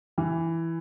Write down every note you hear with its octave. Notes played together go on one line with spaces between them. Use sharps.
E3